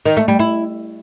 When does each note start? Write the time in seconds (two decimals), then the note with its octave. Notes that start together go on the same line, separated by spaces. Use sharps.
0.05 D#3
0.17 A3
0.28 G3
0.39 E4